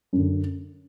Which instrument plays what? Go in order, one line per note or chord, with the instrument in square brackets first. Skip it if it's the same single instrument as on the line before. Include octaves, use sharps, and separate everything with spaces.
[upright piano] F#2 D3